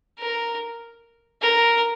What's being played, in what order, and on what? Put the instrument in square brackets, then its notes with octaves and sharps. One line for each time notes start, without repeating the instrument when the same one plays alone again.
[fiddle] A#4
A#4